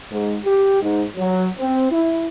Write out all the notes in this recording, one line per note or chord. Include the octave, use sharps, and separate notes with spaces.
G#2
G4
G#2
F#3
C4
E4